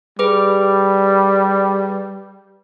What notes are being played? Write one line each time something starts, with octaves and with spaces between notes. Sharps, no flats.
G3 G#4 B4 D6